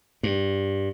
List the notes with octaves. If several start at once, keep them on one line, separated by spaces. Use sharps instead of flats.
G2